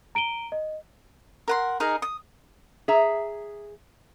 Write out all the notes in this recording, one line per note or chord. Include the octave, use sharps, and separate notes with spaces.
A#5 D7 D#7 G7
D#5
A#4 F#5 C6
D#4 G#4 A#4 D#5
D#6
G#4 E5 A#5